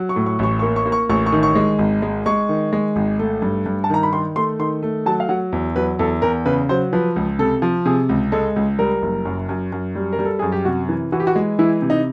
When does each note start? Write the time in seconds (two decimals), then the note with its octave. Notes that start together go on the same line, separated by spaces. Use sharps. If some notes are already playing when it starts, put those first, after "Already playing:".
Already playing: F#3
0.09 C#6
0.16 A2
0.26 C#6
0.39 A1 C#6
0.59 A#3 C#6
0.76 C#6
0.86 A#3
0.92 C#6
1.10 A1 C#6
1.26 C#6
1.32 D#3
1.43 C#6
1.55 G#3
1.79 G#1
2.02 G#3
2.26 G#3 C#6
2.49 D#3
2.73 G#3
2.96 G#1
3.19 A3
3.42 G2
3.66 G2
3.84 A5
3.90 D#3 A#5
4.03 B5
4.12 D#3 C6
4.36 A3 C6
4.59 D#3 C6
4.83 A3
5.06 F#3 A5
5.20 F5
5.29 F#3 F#5
5.52 E2
5.76 F#3 B4
5.99 E2 A4
6.22 E2 A#4
6.46 C#3 B4
6.69 F#3 C5
6.93 F3 B4
7.16 C#2
7.39 C3 A4
7.62 F3
7.85 C3 G#4
8.09 C#2
8.32 G#3 A4
8.56 C#2
8.79 G3 A#4
9.02 F#1
9.26 F#2
9.49 F#2
9.72 F#2
9.95 G3
10.13 A#4
10.19 G3
10.26 A4
10.39 F#2 G#4
10.52 G4
10.65 C3 F#4
10.89 E3
11.12 E3 F#4
11.20 G4
11.27 F#4
11.36 G#3
11.59 E3 E4
11.82 C3
11.90 D#4